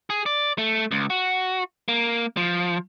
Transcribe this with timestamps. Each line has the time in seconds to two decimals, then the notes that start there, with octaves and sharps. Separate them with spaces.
0.10 G#4
0.26 D5
0.58 A3
0.91 C#2
1.10 F#4
1.88 A#3
2.37 F3